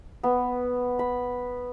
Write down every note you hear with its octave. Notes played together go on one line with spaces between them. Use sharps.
B3
B5